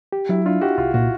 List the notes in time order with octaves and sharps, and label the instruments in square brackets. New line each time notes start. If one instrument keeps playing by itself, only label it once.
[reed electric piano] G4
[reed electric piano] F#3 [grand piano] E4
[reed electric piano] D4 [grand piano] F4
[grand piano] F#4 [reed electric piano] G4
[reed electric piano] C2 [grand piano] F4
[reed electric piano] A#2 [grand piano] F#4